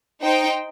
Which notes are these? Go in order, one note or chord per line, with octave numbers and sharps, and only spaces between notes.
D#4 C5 G5